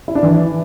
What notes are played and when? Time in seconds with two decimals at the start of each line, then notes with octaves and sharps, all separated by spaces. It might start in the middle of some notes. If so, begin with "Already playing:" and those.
0.08 E4
0.15 D4
0.23 E3